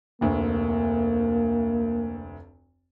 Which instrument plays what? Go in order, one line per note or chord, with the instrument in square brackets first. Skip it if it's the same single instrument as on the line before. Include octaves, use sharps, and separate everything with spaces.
[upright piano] F1 D2 [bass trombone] A#3